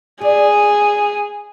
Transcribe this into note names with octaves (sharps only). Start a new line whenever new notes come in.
G#4 D5